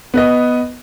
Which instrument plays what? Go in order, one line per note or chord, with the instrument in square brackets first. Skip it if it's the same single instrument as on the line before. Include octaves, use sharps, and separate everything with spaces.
[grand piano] B3 B4 D#5